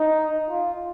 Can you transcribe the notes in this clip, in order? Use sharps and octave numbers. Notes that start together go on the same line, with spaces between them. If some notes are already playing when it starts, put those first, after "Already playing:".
Already playing: D#4
F4